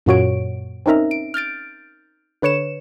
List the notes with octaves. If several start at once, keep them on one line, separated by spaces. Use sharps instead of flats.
F#2 A#2 A#3 F#4 C#5 D7
C4 C#4 D#4 A#4 E5 A#5
D7
F6 G6 A6 D7
D3 B4 C#5 C#7 E7